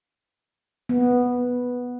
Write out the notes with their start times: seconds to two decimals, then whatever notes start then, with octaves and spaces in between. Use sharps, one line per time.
0.89 B3